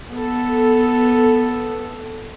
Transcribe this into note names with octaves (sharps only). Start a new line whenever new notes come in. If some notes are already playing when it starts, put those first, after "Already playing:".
B3 A4